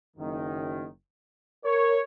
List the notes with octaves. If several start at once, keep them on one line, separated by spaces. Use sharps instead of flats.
F#1 F#2 D#3
A#4 C#5